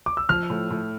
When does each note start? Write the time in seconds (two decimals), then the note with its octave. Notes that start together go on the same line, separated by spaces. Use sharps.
0.06 D6
0.17 E6
0.29 F3 F6
0.50 A2
0.70 A2